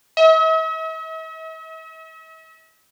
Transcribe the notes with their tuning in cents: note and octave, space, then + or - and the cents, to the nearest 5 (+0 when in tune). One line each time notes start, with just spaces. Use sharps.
E5 -45